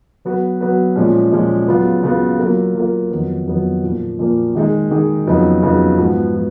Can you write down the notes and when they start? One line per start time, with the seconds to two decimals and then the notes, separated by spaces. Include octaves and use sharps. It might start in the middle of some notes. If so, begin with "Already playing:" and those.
0.25 F#3 B3 F#4 B4
0.61 F#3 B3 F#4 B4
0.96 A#2 F3 G#3 C#4
1.32 A#2 F3 G#3 C#4
1.68 C#3 F#3 B3 F4
2.03 C#3 F#3 B3 F4
2.39 F#3 A#3 F4 A#4
2.75 F#3 A#3 F4 A#4
3.11 F2 D#3 F#3 B3
3.47 F2 D#3 F#3 B3
3.84 A#2 F3 A#3
4.19 A#2 F3 A#3
4.55 D#3 G#3 D#4 G#4
4.91 D#3 G#3 D#4 G#4
5.27 F2 C#3 F#3 B3 D#4
5.62 F2 C#3 F#3 B3 D#4
5.98 G#2 F3 B3 F#4 B4
6.35 F3